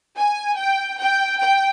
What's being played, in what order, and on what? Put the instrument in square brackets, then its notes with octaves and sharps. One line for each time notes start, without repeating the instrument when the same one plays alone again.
[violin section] G#5
G5
G5
G5